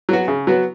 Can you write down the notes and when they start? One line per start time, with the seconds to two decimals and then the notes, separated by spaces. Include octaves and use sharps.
0.09 F#3 B3 F#4
0.28 C#3
0.47 F#3 B3 F#4